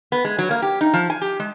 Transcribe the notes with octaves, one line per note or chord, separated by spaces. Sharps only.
B3
G#3
F#3
A#3
G4
D#4
F3
G#5
G4
G#3